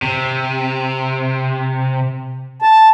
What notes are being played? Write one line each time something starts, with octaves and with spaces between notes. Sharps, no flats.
C3
A5